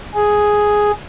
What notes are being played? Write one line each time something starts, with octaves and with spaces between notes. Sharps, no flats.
G#4